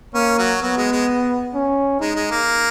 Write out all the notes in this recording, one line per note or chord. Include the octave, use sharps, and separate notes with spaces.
A#3 C#4
F#3
F#3 B3
G#3
G#3
C#4
G#3 D#4
G#3
A#3